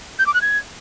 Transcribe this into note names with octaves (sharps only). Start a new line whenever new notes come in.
G6
D6
F#6
G#6